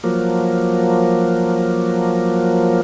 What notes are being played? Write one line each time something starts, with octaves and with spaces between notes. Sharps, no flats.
F3 F#3 A#3